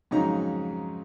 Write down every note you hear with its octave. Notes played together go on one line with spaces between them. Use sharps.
F2 G#2 C#3 F#3 D#4 A#5